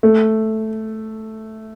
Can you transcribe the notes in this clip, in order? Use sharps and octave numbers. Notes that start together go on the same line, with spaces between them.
A3